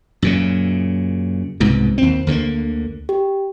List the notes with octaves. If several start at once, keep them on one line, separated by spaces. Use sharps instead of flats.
F#2 A#2 C#3
C2 G#2 B2
D#2 C4
D2 D3 D#3 A#3
G4